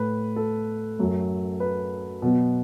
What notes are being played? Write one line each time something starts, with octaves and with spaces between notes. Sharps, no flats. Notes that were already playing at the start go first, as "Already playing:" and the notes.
Already playing: A2 A3 B4
A4
F#2 F#3 A3
B4
B2 F#3 B3